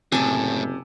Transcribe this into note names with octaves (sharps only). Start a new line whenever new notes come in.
F#1 A2 C3 G#5 A5